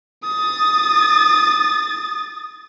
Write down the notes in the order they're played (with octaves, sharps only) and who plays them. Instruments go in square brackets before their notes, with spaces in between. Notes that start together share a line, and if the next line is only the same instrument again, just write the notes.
[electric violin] D#6 A6